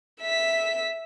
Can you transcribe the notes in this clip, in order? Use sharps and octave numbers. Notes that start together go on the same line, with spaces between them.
E5 B6